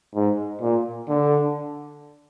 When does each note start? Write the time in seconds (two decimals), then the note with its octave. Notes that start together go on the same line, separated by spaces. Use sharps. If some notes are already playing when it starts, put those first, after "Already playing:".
0.14 G#2
0.61 A#2
1.09 D3